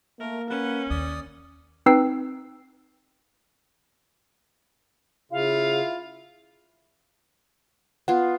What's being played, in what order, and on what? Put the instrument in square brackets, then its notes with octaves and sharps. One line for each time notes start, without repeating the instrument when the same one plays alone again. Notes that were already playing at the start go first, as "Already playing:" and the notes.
[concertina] A3 [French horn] A#3 [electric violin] A#4
[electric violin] C#4 [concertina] B4 F#5
[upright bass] D#2 [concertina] D5 D#6
[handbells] C4 D#4 B4 G5 E6 C7
[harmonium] C#3 [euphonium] E4 [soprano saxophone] F4 [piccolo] F5
[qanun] B3 F4 [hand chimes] F#5